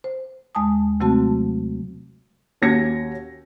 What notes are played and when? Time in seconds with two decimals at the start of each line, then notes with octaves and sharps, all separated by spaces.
0.04 C5
0.55 D#2 G#3 G#5 A5 D#6
1.00 C3 F#3 A3 C4 F#4 A5
2.62 D#2 C#4 F#4 G#6 A#6 C#7